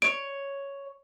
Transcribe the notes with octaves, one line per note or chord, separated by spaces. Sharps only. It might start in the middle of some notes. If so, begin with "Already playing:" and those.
C#5 D7